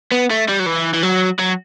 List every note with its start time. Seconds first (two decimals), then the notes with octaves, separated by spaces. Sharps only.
0.12 B3
0.30 A3
0.49 G3
0.60 F#3
0.66 E3
0.94 E3
1.03 F#3
1.39 F#3